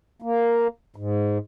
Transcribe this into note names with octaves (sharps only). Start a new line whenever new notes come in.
A#3
G#2